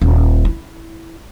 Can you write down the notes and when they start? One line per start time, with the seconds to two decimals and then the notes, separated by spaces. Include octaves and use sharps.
0.01 D#1
0.45 E4